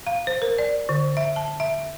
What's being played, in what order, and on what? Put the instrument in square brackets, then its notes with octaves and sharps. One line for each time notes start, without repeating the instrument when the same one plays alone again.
[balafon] F5
C5
A#4
D5
D3
E5
A5
E5